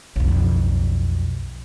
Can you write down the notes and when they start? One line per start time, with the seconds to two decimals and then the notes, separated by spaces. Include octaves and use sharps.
0.16 B1 F2